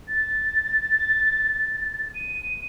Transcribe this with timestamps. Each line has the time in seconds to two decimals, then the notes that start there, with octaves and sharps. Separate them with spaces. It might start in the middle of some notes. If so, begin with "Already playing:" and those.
0.08 A6
2.15 D#7